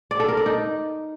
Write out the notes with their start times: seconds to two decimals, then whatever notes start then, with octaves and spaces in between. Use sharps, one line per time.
0.11 D5
0.20 A4
0.28 A#4
0.37 D5
0.46 D#4